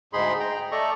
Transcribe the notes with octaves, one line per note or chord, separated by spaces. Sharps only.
D2 G#2 D#4 G#4 B5 C6
G5 A#5
A3 A4 D5 D#5 A#5 C#6